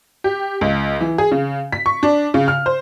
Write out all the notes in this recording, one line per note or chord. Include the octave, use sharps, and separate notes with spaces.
G4
C#2
E3
G#4
C#3
B6
C#6
D4
C#3
F6
C5